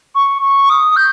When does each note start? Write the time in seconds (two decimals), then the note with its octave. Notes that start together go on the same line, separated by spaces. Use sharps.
0.15 C#6
0.42 C#6
0.69 D#6
0.96 G6